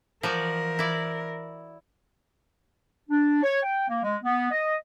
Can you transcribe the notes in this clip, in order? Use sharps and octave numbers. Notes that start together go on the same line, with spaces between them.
E3 F3 F#4 A#4 D5
E4 D5
D4
C#5
G5
A#3
G#3
B3
D#5